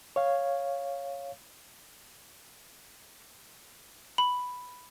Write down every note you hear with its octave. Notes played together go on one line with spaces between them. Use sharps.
C#5 F5
B5